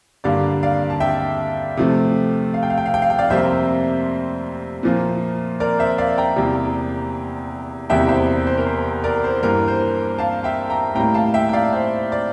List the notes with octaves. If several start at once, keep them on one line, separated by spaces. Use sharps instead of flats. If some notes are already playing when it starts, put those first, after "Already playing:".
G2 D3 G3 A#3 D5 F5
D5 F5
A5
E5 G5
C3 F3 A3
F5
G5
F5
G5
F5
G5
F5
G5
D5 F5
F2 C3 G3 A#3 C5 E5
A#2 F3 A#3
A#4 D5
C5 E5
D5 F5
G5 A#5
E2 C3 G3 A#3
E2 C3 G3 A#3 E5 G5
C5 E5
C5
A#4
C5
A#4 D5
C5
G2 E3 A#3 A#4
C5
F5 A5
E5 G5
G5 A#5
A2 G3 A#3 G5 A#5
F5 A5
E5 G5
G5
D5 F5
C5
D5